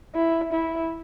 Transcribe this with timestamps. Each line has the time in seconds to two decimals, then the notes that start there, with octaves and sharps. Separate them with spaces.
0.15 E4
0.53 E4